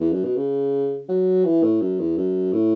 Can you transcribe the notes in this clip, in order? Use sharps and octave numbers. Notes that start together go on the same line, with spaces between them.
E2
F#2
B2
C#3
F#3
E3
A2
F#2
E2
F#2
A2